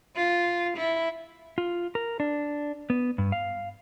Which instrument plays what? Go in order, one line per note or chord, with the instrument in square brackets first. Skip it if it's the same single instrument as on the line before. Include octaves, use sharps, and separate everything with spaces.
[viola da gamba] F4
E4
[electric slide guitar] F4
A#4
D4
B3
G2
F5